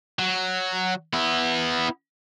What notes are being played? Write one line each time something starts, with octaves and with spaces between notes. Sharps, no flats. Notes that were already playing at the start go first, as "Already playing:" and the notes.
F#3
B3 E4